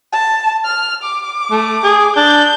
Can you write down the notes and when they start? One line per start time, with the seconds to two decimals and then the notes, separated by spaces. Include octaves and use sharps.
0.13 A5
0.65 F6
1.03 D6
1.51 A3
1.83 G#4
2.16 D4 G6